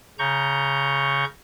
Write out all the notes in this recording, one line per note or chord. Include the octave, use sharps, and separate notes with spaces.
C#3 A#5 C#6 G6